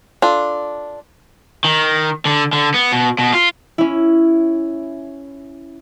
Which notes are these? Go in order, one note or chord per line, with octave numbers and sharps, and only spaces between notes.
D4 F4 A4
D#3
D3
D3
B3
B2
B2
F4
C#4 E4